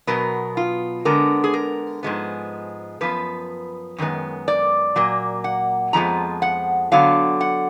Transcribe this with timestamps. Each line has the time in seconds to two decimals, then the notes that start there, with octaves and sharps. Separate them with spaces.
0.07 B2 F#3 B3 A#4
0.57 F4
1.05 D3 G#3 B3 A#4
1.44 G#4
1.54 A#4
2.03 G#2 F3 G#3 B3
3.01 F#2 F3 B3 B4
3.98 F#2 D#3 G#3 B3
4.48 D5
4.96 A#2 F#3 A#3
5.44 F#5
5.93 F2 F3 G#3 B3 A#5
6.42 F#5
6.92 D3 F#3 B3 F5
7.41 F#5